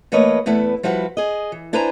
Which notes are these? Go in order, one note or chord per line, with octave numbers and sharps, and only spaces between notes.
E3 A3 A#3 B4 C#5 D#5
E2 A3 B3 E4 B4
F3 G3 E4 F#4 G#4 B4
G#4 D#5
E3
D4 E4 B4 C5 G#5 A#5